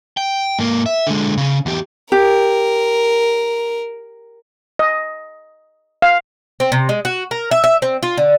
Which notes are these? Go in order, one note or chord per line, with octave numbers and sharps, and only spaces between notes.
G5
G#2 A#3
E5
D3 G#3
C#3 C#4
E2 G4
G4 A#4
D#5
F5
C4
C3
G#3
F#4
A#4
E5
E5
C4
F4
D3